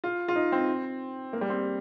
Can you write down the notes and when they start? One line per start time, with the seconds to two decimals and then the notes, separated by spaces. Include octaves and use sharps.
0.04 F4
0.28 F4
0.36 D#4
0.52 C4
1.33 A#3
1.41 G3
1.50 C4